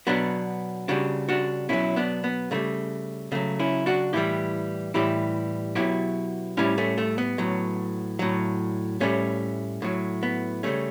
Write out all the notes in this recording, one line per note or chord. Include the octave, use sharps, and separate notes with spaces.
B2 F#3 B3 D4
C#3 G3 D4 F#4
D4 F#4
B2 F#3 C#4 E4
B3 D4
B3
C#3 E3 G3 A3
C#3 F#3 A3
C#4 E4
D4 F#4
A2 E3 G3 E4 G4
A2 E3 G3 E4 G4
B2 F#3 E4 G4
A2 G3 C#4 E4
A3 C#4
A3
B3
A2 F#3
A2 F#3
A2 G3 A3 C#4
A2 F#3
B3
C#3 G3 A3 C#4